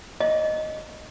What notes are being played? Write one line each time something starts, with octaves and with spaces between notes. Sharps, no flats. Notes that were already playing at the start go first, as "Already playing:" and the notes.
D#5